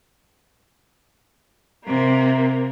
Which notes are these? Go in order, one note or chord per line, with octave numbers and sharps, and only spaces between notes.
C3 A#3